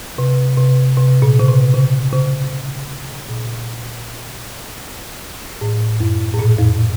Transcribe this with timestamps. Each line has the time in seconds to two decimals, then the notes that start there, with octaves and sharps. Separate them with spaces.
0.18 C3
0.58 C3
0.97 C3
1.22 A#2
1.39 C#3
1.48 C3
1.74 C#3
2.13 C#3
3.29 A#2
5.61 A2
6.00 F#2
6.34 A2
6.39 A#2
6.58 F2